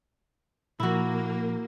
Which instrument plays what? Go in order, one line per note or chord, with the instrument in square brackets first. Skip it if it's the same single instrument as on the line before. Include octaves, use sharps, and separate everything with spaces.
[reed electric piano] A#2 F3 [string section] A#3 [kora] E4 F#4